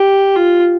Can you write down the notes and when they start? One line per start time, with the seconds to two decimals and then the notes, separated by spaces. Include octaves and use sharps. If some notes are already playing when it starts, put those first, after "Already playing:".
Already playing: G4
0.36 F4